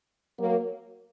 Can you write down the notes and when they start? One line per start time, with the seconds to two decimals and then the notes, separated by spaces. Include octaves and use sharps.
0.39 F#3 A#3